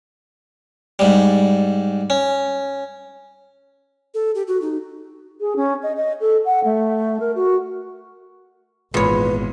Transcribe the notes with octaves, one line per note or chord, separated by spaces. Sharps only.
G#2 G3
C#4
A4
G4
F#4
D#4
G#4
C#4
D#5
D#5
A4
F#5
A3
A#4
F#4
G#1 E2 A#2 G#3 B4 C#5